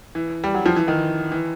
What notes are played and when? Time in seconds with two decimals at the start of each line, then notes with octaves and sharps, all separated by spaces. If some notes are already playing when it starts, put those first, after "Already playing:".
0.15 E3
0.44 G3
0.54 F#3
0.66 F3
0.76 E3
0.88 D#3
1.32 E3